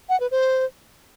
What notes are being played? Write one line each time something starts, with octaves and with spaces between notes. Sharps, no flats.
F#5
B4
C5